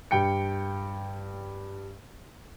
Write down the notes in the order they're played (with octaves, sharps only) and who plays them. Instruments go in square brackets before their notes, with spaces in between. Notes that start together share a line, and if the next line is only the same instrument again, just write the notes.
[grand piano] G2 G5 C#7